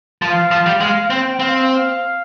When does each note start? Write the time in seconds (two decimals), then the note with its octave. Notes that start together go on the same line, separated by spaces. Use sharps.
0.22 F3 F5
0.51 F3
0.66 G3
0.80 G#3 F5
1.10 C4 G5
1.40 C4 F5
1.69 F5